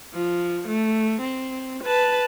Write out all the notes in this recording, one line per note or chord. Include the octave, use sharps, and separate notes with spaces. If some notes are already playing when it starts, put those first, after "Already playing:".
F3
A3
C4
B4 A5